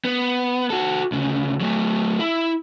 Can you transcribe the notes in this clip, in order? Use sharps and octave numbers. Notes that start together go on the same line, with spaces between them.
B3
F#4 A4
D2 C#3
F#3 A3
E4